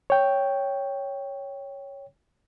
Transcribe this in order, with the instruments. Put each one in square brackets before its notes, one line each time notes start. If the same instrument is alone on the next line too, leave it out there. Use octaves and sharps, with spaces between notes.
[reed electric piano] C#5 G5